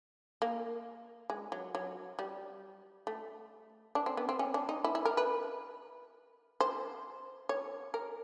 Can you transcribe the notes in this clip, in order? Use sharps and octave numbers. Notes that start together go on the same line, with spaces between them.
A#3
G#3
F#3
F#3
G3
A3
D4
C4
B3
C4
C#4
D4
D#4
E4
E4
A#4
B4
C5
C#5
A#4